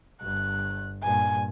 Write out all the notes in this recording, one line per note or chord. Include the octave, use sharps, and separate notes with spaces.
G1 F#6
G2 A#2 G#5